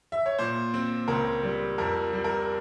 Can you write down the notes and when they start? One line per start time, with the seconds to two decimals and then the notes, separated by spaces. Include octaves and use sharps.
0.12 E5
0.26 C#5
0.39 A#2 C5
0.74 C4
1.08 C#2 A#4
1.43 G3
1.78 F2 A#4
2.13 G3
2.24 A#4